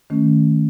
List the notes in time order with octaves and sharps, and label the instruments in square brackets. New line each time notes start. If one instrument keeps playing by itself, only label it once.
[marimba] D#3 A3 C#4